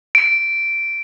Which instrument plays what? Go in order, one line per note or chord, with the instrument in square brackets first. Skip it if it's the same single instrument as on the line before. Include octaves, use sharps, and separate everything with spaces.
[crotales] D7